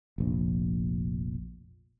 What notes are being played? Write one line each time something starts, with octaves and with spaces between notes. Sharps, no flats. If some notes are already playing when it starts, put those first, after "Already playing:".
F1 A#1